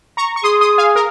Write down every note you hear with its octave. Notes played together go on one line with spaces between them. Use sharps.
A#5 C#6
C#6
G#4 C6 D#6
C6 D#6
F5 G#5
A#4